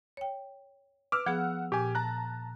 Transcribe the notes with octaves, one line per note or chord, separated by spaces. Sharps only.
C#5 G5
B4 D6 E6 F6
F3 B3 G#4 F#5
A#2 G4 G#5
A5 A#5 F#6